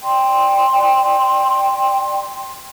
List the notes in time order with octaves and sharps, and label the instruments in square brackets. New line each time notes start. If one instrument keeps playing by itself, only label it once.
[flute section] D5 G5 C6